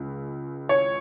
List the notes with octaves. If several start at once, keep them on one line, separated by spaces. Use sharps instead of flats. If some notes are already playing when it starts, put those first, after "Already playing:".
Already playing: C#2 C#3
C#5